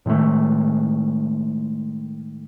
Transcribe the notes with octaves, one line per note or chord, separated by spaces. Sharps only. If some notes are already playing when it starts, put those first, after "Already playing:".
A2 D#3 G#3 A3